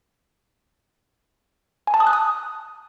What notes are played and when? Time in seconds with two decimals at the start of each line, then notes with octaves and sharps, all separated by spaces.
1.87 G#5
1.94 A5
2.00 D#6
2.07 F#6
2.13 D#6